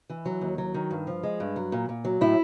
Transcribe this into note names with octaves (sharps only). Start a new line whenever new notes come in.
E3
F#3
D#2
F#3
D#3
G2
F3
G#3
G2
F#3
A#2
A#2
F#3
A2 E4